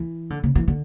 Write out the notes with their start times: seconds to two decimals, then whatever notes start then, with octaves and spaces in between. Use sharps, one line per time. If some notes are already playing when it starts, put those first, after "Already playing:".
Already playing: E3
0.30 D3
0.43 C#3
0.55 E3
0.68 D3